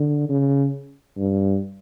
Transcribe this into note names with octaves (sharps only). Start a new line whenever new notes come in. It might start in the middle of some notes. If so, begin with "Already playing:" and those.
Already playing: D3
C#3
G2